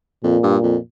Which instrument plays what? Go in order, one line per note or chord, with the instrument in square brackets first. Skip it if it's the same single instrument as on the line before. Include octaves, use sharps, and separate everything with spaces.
[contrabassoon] F2 [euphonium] A#2
[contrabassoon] G2
F2